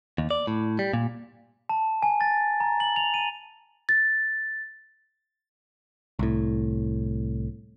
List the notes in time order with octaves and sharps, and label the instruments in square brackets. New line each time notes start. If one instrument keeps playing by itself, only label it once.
[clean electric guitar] D#2
D5
A2
G3
A#2
[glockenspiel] A5
G#5
A6
A#5
F#7
F7
D#7
[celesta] A6
[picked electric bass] C2 A2